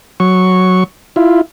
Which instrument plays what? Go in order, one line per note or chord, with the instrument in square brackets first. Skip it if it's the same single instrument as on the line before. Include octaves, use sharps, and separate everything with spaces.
[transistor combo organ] F#3 C#6
E4 F4